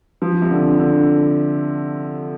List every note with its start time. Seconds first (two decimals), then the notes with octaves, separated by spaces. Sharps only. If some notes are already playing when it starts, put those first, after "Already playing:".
0.22 F3
0.42 C3
0.51 D3
0.79 D3